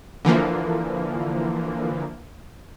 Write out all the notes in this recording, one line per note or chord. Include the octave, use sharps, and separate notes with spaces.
D3 E3 F3 A#3